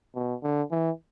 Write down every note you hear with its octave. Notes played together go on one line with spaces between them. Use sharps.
B2
D3
E3